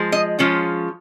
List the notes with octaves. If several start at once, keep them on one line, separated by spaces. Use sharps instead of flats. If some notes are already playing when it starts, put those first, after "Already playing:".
Already playing: F3 G#3
D#5
F3 G#3 C#4 F4